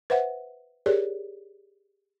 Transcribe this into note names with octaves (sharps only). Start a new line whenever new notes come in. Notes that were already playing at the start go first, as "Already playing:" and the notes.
B4 C5 E5 F#5
G4 G#4 A#4 C#5 D5